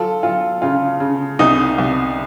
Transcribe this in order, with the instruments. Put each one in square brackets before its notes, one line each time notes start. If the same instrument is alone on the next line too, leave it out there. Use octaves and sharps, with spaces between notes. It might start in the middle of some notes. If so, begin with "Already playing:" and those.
Already playing: [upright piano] F#3 F4 A4
F#3 F4
C#3 F4
C#3
C2 D#4
C2